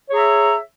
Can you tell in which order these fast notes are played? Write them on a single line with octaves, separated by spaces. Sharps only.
C#5 G#4 A#5 E5